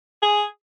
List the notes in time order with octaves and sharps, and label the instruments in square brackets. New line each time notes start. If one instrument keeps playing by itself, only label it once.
[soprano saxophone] G#4